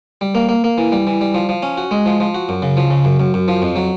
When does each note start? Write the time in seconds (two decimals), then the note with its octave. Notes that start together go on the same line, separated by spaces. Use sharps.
0.21 G3
0.35 A#3
0.49 A#3
0.64 A#3
0.78 E3
0.92 G3
1.07 E3
1.21 G3
1.34 F3
1.49 F3
1.62 C#4
1.77 F#4
1.91 G#3
2.06 F3
2.20 F3
2.34 F#4
2.49 F#2
2.62 C#3
2.77 F3
2.90 C#3
3.05 F#2
3.20 F#2
3.34 F#2
3.48 F3
3.62 F2
3.76 F#3